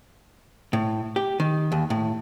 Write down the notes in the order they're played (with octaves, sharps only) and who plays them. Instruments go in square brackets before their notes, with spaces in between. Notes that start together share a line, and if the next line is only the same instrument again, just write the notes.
[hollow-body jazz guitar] A2
G4
D#3
D#2
A2